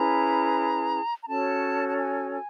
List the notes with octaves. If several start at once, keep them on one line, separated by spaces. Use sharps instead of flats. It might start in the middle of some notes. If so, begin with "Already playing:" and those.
Already playing: C#4 E4 G#4 B4 A#5
A#5
C#4 F#4 A4 C#5 A5
A5
G#5
G#5